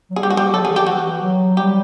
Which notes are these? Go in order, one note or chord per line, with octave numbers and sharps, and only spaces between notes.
F#3
G3 G#4
G4
F#4
G4
F#3 A4
F3
E3 G#4
E3 G4
F#4
F#3
G3 G4